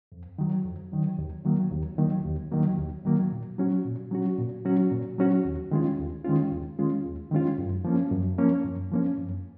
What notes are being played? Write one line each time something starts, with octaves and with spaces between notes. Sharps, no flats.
F2
D#3 F#3
F2
D#3 F#3
D#2
D#3 F#3 A#3
D#2
D#3 F#3 A#3
D#2
D#3 F#3 A#3
D#2
D#3 F#3 A#3
A#2
F#3 C#4 F#4
A#2
F#3 C#4 F#4
A#2
F#3 C#4 F#4
A#2
F#3 C#4 F#4
D#2
D#3 G#3 C#4 F4
D#2
D#3 G#3 C#4 F4
D#2
D#3 G#3 C#4 F4
D#2
D#3 G#3 C#4 F4
F#2
F3 A#3 C#4
F#2
F3 A#3 C#4
F#2
F3 A#3 C#4
F#2